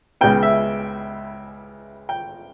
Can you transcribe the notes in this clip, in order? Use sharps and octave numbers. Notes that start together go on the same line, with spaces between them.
C#2 C#3 G#3 B3 G5
E5
G5